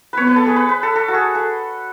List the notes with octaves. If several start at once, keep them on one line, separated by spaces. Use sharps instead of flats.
B3 B4 C#5
B4
A4
G#4
B4
B4
A4
A4
F#4
G#4
A4